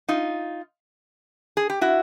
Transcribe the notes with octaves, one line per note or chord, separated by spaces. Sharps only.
D#4 F4
G#4
G4
E4 F#4